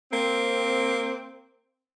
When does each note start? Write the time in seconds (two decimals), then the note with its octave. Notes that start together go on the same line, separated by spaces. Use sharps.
0.10 A#3 C4